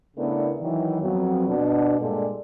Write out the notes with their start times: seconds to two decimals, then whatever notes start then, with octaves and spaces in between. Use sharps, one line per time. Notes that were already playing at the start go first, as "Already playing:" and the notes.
0.17 C#3 A3 B3 D4 E4 A#4
0.61 D#3 E3 F#3
1.02 F2 F#3 B3
1.48 B2 D4
1.99 G2 A#2 G#3 A4 D5